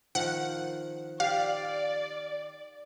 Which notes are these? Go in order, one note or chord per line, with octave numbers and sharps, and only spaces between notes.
D#3 F3 F#5
G4 D5 F5